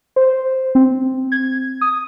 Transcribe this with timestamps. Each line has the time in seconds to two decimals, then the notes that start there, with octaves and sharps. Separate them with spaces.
0.16 C5
0.75 C4
1.32 G#6
1.81 D#6